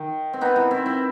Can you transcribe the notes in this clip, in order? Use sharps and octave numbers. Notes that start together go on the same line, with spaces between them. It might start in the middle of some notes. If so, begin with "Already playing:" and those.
Already playing: D#3
C4
B3 D#4
C4 E4
C4 E4
C4 E4